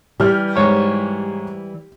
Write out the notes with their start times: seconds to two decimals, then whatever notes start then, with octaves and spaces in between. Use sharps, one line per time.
0.20 E3 G3 G4 F6
0.56 G#2 C#5 C#6